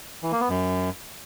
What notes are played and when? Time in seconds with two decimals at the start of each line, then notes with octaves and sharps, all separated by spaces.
0.23 E3
0.32 A#3
0.41 B3
0.49 F#2